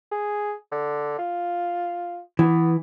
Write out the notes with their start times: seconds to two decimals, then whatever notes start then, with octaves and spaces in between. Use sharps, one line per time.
0.11 G#4
0.72 D3
1.19 F4
2.39 E3 B3